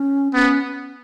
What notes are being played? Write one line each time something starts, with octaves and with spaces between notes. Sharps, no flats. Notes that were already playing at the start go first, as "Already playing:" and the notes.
Already playing: C#4
B3 C#4